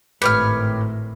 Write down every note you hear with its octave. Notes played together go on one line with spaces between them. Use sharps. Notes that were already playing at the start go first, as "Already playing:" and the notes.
G#1 A2 G4 B4 C#5 F6